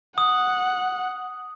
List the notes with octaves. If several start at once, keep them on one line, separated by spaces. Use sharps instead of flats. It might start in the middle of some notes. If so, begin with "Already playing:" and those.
F#5 D#6